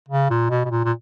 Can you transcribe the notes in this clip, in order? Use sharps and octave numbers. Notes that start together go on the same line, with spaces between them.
C#3
A#2
B2
B2
A#2
A#2